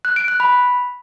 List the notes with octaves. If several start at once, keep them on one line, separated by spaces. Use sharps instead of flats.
F#6
D7
F#6
B5